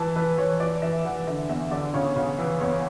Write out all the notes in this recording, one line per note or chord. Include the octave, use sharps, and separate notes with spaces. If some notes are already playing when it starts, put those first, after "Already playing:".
Already playing: E3 A5
E3 B4
E3 C#5
E3 D5
E3 E5
E3 F#5
D3 E5
E2 E5
D3 D5
C#3 C#5
C#3
E3
E2 C#5